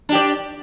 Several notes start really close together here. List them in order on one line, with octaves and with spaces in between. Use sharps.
D4 G4 D5